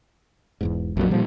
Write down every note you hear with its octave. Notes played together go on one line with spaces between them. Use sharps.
E1 E2 G#2
A#1 F2 A#2 F#3
A#2 F3 G3